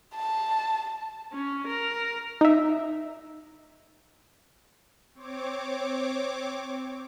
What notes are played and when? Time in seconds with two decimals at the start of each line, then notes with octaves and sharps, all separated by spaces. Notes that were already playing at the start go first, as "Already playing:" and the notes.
0.15 A5
1.33 C#4
1.68 A#4
2.41 D#4 E5
5.14 C4 C#5 D6